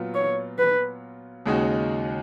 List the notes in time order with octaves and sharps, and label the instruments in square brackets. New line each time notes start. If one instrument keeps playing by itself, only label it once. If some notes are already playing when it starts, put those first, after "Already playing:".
Already playing: [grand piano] A#2 F#3 B3 F4
[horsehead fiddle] C#5
B4
[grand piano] D#2 C#3 G#3 D#4 F#4